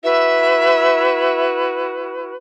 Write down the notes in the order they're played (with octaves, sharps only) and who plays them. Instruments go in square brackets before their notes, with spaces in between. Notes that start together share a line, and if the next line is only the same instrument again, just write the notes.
[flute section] E4 F#4 B4 [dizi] E5